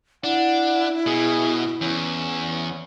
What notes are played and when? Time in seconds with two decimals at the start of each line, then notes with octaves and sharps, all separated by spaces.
0.24 D4 E4 F#5
1.06 B2 G#4
1.81 E2 C#4